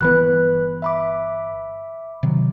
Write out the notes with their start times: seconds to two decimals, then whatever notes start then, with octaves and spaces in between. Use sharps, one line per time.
0.01 G1 E3 B3 B4 B5 F#6
0.82 E5 B5 D6
2.23 C3 D#3 F#3